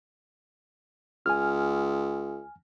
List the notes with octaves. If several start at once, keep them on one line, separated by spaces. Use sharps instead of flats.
C#2 G#5 F6